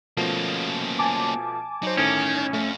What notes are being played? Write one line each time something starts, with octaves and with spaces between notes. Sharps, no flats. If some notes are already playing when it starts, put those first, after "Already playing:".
B2 F3 A3 A#3 C#4
G#5 A5 D6
F#3 D#4 C5
G1 A2 D#3 C#4 D7
F2 A3